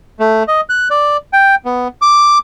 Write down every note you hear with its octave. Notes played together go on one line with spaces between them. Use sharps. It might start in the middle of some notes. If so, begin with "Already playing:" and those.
A3
D#5
F#6
D5
G5
B3
D6